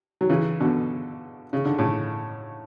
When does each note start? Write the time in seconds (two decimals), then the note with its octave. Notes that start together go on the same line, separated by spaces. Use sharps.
0.21 F#3
0.29 C#3 E3
0.60 B2 D3
1.53 C#3
1.65 D3
1.78 A2 C#3